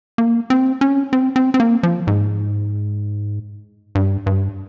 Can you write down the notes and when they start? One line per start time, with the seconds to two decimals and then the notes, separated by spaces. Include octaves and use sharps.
0.18 A#3
0.50 C4
0.81 C#4
1.13 C4
1.36 C4
1.54 C4
1.60 A#3
1.83 F3
2.07 G#2
3.95 G2
4.26 G2